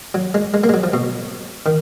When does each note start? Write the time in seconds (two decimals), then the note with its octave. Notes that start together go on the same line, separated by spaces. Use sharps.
0.14 F#3
0.34 G#3
0.54 G#3
0.64 A#3
0.69 G#3
0.74 F#3
0.84 F3
0.93 B2
1.66 D#3